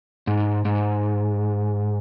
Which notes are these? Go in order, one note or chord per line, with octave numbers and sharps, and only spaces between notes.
G#2
G#2